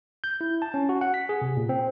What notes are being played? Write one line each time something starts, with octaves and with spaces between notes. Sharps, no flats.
G6
E4
A5
C#4
F#4
F#5
B6
G#4
C3
A#2
C4